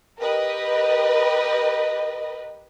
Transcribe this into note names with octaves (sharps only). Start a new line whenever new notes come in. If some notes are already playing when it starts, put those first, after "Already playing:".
G4 A#4 B4 D#5